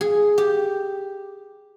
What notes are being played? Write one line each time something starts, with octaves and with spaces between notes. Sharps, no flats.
G#4
G4